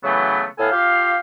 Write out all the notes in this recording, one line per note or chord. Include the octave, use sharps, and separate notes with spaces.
C#3 E3 F#3 A3 B3
A2 B3 A4 F5 G#5
F4 G4 F5